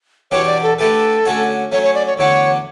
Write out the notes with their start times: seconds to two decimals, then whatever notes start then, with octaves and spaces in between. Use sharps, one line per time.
0.31 E2 B2 G3 D4 G4 C#5
0.47 D5
0.63 A4
0.78 D3 A3 E4 G4 A4 B4
1.25 D3 A3 C#4 F#4 C#5
1.72 F#3 A3 C#4 C#5
1.83 C#5
1.94 D5
2.07 C#5
2.18 E2 D3 A3 D4 F#4 C#5